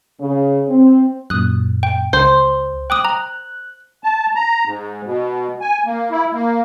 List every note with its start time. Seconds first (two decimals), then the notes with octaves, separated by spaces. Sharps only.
0.20 C#3
0.68 C4
1.30 F#2 A#2 D#6 F#6
1.83 G5
2.13 C#2 C5
2.90 G5 D6 D#6 F#6
3.05 A#5
4.04 A5
4.35 A#5
4.65 G#2
5.05 B2
5.61 G#5
5.86 A#3
6.11 E4
6.33 A#3